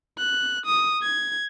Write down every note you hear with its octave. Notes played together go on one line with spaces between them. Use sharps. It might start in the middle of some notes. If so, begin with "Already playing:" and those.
F#6
D#6
G#6